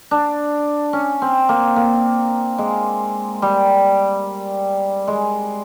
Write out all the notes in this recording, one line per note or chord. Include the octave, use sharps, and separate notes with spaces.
D4
C#4
C4
A#3
A#3
G#3
G3
G#3